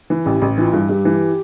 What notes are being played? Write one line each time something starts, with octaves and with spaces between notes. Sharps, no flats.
E3
A1 G4
A1
E3 F4
G2
G2 G4
E3